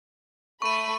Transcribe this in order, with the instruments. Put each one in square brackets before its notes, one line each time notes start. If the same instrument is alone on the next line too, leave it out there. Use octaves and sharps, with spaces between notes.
[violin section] A3 B5 [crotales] C#6 D#7